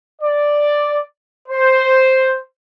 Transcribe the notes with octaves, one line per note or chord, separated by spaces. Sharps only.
D5
C5